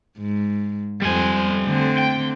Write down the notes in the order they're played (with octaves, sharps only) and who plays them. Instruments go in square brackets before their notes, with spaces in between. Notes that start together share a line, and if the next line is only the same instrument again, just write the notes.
[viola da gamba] G#2
[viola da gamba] F2 C5 [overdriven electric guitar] G3 G#5
[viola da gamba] D3 A3 C4
[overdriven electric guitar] G5